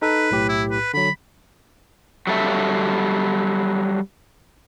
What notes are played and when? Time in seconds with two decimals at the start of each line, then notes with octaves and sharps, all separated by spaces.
0.02 D#4 A4 B4
0.31 B1 A2 G4
0.49 E4
0.71 B4
0.94 D3 F#3 B5
2.27 F#3 G3 A4 E5